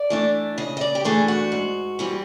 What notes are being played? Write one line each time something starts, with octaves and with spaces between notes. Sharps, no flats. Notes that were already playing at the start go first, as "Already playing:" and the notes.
Already playing: D5
E3 A3 D4
C#3 D#5
D#5
D5
G4
E3 A3 D4 G#4
F#4
G#2
E3 G3 C4